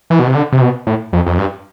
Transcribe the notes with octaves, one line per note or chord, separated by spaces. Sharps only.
E3
B2
C3
D3
C3
B2
A2
F2
F2
G2